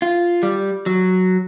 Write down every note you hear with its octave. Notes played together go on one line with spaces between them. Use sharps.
F4
G3
F#3